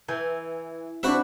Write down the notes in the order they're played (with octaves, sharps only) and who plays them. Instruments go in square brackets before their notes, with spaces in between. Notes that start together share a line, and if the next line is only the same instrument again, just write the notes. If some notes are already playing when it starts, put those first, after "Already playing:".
[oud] E3 [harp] G#5 G6
[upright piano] C4 D4 [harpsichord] F#4 B4 E5 [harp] C5 F#5 B5